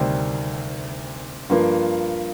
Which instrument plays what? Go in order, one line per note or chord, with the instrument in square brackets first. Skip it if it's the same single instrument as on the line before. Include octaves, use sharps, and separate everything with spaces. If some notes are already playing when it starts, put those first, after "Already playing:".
Already playing: [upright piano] D2 C3 D#3 G3 C4
G2 F3 A#3 F4